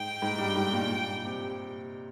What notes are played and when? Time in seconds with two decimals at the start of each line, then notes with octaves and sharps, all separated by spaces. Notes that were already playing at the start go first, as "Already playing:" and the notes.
Already playing: G#2 G5
0.22 G#2
0.38 G2
0.56 G#2
0.73 A#2
1.25 C3